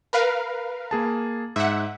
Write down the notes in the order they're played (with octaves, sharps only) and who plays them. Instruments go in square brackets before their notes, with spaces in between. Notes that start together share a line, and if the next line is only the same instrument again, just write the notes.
[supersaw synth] A#4 B4 F5
[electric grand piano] A#3 G#4 A5
[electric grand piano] G#2 [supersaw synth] E5 F#5